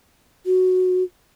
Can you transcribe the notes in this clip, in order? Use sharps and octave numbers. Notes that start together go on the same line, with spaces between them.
F#4